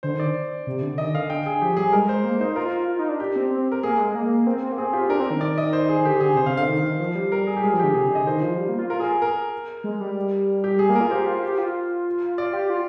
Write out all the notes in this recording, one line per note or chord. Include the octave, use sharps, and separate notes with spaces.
D3 C5
D#3
D5
C3
D3
D#3 D#5
D3 F5
D3 G5
G#4
F3 G4
G3 G#4
G#3 A#4
C5
A#3
D#4 C5
F4 A#4
F4
D#4
D4
G4
C4
C4
A#4
A#3 G#4
G#3 G#4
A#3
C4
C4
A#3
C4 G#4
F4 G4
D4 A#4
C4
D#3
D5
D#5
C5
G#4
D#3
D3 G4
D3 G#4
C3 C5
C3 F5
D3 F5
D#3
D#3
F3
G3
A#4
G#4
G4
G#3 G#4
F3
D3 G4
C3 G#4
D3 G#4
D#5
D#3 C5
F3
G3
A#3
F4
F4 A#4
G#4
G#4
A#4
G#3
G3
G4
G3 G#4
A#3
A#4
F4
G4 C5
F4
G4
F4
F4 D5
G4
F4